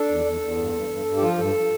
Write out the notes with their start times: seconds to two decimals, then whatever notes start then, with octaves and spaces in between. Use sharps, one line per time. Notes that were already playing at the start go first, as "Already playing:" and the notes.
Already playing: D4 A4
0.09 E2
0.25 E2
0.41 E2
0.57 G2
0.73 G2
0.89 G2
1.05 G2
1.17 G4
1.22 F3 F4
1.38 G2 A4